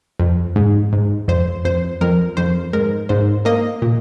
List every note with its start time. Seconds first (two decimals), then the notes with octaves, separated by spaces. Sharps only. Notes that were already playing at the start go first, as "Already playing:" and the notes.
0.20 F2
0.56 G#2
0.93 G#2
1.28 F2 C5
1.65 F2 C5
2.01 F2 A#4
2.37 F2 C5
2.73 G#2 A#4
3.09 G#2 C5
3.45 A#3 A#4 D#5
3.82 A#2